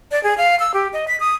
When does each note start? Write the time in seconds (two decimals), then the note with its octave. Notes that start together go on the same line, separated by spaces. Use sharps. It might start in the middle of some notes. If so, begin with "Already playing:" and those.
0.11 D5
0.24 G#4
0.38 F5
0.60 E6
0.74 G4
0.93 D#5
1.08 B6
1.20 D#6